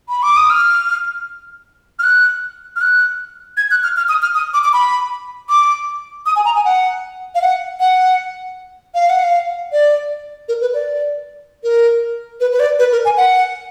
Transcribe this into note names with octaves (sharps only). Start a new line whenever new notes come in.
B5
D6
D#6
F6
F6
F#6
F6
F#6
G#6
F#6
F6
F6
D#6
F6
D#6
D6
D6
B5
D6
D#6
G#5
A#5
G#5
F#5
F5
F#5
F#5
F5
F#5
F5
D5
A#4
B4
D5
A#4
B4
B4
D5
B4
A#4
G#5
F#5